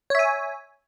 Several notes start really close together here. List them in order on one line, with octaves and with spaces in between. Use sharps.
C#5 E5 G#5